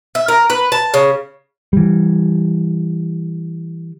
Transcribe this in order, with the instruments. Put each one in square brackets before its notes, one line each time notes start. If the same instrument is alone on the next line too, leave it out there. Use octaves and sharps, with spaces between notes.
[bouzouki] E5
A#4
B4
A5
C#3
[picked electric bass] E3 G3